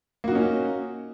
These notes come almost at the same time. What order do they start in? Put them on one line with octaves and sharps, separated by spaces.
A#3 F#4 D#4 C#4